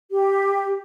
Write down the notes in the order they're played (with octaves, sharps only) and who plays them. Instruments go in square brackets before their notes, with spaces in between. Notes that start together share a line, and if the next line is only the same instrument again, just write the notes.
[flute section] G4